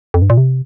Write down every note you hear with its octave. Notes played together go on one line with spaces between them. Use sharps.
F2
G2
A#2
C3